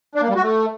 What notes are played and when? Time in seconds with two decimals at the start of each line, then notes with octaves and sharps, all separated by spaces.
0.15 D4
0.22 A#3
0.29 G3
0.36 F#4
0.43 A3